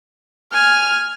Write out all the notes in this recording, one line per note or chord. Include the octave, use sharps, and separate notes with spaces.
G#5 F6